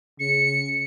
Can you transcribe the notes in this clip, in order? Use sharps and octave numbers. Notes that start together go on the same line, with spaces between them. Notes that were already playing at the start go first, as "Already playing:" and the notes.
C#3 C#7